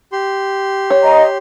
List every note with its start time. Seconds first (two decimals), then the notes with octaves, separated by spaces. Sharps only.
0.12 G4 C6
0.90 C#5
1.03 D#5 A#5